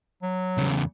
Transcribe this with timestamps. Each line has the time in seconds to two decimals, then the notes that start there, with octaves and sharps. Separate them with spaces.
0.22 F#3
0.58 E2 C#3